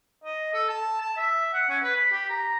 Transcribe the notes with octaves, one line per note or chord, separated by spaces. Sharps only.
D#5
A4
A5
A5
E5
F#5
C#4
B4
B5
G4
A#5